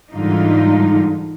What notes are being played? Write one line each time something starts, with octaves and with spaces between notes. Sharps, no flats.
G#2 D3 E3 G3 D#4 F4